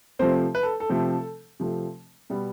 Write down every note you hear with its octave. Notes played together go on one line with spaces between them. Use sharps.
C3 F3 A3 C4 C5
B4
A4
A4
C3 F3 A3 C4
C3 F3 A3 C4
B2 G3 B3